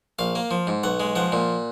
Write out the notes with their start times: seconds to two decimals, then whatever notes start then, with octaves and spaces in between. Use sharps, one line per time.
0.19 A#1 F5
0.35 A#3
0.51 F3
0.67 G#2
0.83 B1 F#5
1.00 G#3
1.16 F3 F#5
1.32 A#2